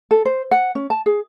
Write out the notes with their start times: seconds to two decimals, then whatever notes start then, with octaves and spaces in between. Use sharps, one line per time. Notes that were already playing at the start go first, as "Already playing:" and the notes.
0.11 A4
0.25 C5
0.51 F#5
0.75 C#4
0.90 A5
1.06 G#4